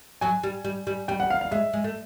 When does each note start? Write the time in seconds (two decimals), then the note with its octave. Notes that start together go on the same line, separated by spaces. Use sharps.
0.21 F#3 G#5
0.44 G3
0.65 G3
0.87 G3
1.08 G3 G5
1.20 F#5
1.30 F5
1.41 F5
1.51 G#3 E5
1.73 G#3
1.84 A3